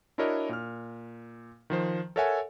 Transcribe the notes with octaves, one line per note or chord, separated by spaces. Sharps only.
D4 E4 F#4 A#4 C#5 D#5
A#2 F6
D#3 F3 C5
A4 A#4 C#5 E5 F#5 G#5